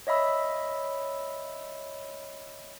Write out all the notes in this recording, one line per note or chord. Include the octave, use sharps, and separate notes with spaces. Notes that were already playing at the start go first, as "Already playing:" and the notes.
C#5 D#5 E5 B5 E6